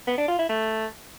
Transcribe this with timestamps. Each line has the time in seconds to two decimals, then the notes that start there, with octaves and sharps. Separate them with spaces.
0.07 B3
0.18 D4
0.28 F4
0.39 E4
0.49 A3